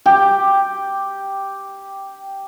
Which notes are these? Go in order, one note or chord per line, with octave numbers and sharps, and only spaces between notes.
G4 G5